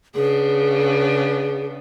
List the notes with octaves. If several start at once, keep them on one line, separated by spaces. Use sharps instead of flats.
C#3 B3 D4 G#4